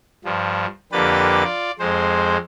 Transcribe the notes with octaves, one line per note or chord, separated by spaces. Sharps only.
G2 F3
F2 D3 A#3 G4 B4 A6
F4 D5
F2 G#3 C5